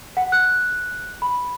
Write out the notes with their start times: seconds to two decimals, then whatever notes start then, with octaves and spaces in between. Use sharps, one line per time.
0.17 F#5
0.32 F#6
1.22 B5